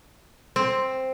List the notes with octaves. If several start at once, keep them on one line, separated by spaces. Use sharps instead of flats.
C4